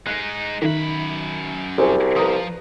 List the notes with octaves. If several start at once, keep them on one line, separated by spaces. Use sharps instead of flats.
G#3 D#4 F#6
F#2 D#3 E5 B5
C2 F#4 G#4 C5
F3 B4 A#5 D#6